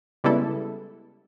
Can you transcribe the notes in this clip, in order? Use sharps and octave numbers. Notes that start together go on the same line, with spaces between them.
C#3 G3 G#3 B3 E4 A4